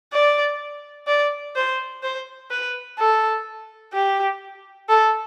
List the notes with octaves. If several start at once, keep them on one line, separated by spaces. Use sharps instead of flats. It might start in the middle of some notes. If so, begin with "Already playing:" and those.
D5
D5
C5
C5
B4
A4
G4
A4